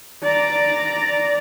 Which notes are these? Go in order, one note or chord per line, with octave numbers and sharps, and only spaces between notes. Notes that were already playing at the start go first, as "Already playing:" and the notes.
D5 A#5